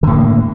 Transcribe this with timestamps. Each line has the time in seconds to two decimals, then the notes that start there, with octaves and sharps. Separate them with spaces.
0.03 D3
0.07 A2
0.12 A#3